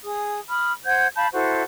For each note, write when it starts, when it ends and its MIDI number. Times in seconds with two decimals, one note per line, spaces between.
0.03 0.39 68
0.03 0.39 87
0.49 0.72 83
0.49 0.72 87
0.49 0.72 89
0.85 1.08 72
0.85 1.08 78
0.85 1.08 91
0.85 1.08 92
1.15 1.28 77
1.15 1.28 81
1.15 1.28 83
1.15 1.28 91
1.33 1.63 64
1.33 1.63 66
1.33 1.63 69
1.33 1.63 72